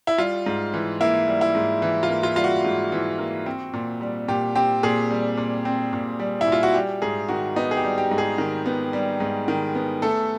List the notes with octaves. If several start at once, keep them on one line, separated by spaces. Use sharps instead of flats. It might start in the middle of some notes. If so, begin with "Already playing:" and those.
E4
G3 F4
G#2
E3
A#3 E4
G3
E4
G#2
E3
F4
A#3
F4
G3 F4
F#4
G#2
E3
A#3
C4
A#2
G3
A#2 G4
C4 G4
A#2 G#4
G3
A#2
C4
A#2
G3
E4
A#2
F4
F#4
G3 G4
G#2 G#4
D#3 F#4
B3 D#4
G#4
G4
G3
G4
G#2
G#4
D#3
B3
G3
G#2
D#3
B3
A3 A4